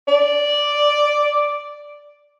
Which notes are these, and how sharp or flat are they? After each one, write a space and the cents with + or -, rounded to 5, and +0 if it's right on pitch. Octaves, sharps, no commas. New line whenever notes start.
D5 -5